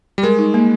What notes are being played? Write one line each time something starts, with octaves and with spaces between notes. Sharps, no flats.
G3
G#3 A#4
D#4
A#3